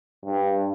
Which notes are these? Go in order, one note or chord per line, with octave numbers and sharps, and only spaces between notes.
G2